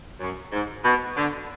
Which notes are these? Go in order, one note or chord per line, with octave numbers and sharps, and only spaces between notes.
F#2
G#2
B2
D3